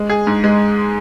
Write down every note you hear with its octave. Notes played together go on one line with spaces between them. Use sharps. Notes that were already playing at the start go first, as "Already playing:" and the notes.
Already playing: G#3
G#4
G#2
G#3